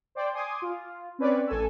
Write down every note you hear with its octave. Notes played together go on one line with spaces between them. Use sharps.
C5 D5 G5
G#5 C6 D6 D#6
F4
C4 C#4 B4 C#5 D5
A1 A4 G#5 E6